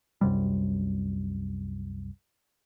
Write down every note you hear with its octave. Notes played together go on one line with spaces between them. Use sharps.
C2 F#2 C3 G3